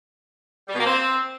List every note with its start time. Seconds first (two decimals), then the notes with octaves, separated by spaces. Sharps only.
0.68 G3
0.74 B2
0.79 A#3
0.85 C4